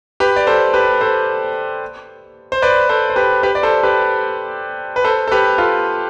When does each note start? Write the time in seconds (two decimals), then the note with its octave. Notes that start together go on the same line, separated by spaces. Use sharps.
0.20 G4 B4
0.36 D5
0.47 A4 C5
0.74 G4 B4
1.01 A4 C5
2.52 C5
2.62 B4 D5
2.89 A4 C5
3.10 C5
3.16 G4 B4
3.43 G4 B4
3.55 D5
3.63 A4 C5
3.83 G4 B4
4.96 B4
5.05 A4 C5
5.28 A4
5.31 G4 B4
5.58 F4 A4